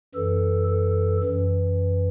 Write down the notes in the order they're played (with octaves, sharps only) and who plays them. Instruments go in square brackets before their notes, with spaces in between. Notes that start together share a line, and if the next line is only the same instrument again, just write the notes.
[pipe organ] F#2 E3 A4
A4
F#2 E3